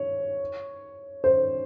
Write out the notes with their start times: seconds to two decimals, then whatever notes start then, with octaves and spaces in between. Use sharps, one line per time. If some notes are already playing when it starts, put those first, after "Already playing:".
Already playing: C#5
1.24 C5